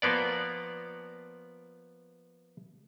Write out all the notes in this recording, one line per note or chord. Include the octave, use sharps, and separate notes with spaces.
F3 A#3 B3 D5